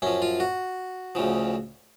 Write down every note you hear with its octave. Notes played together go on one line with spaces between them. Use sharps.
F#2 F3 C#4
F4
F#4
D2 C#3 F3